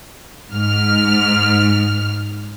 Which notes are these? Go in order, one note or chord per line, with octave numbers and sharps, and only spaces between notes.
G#2 F6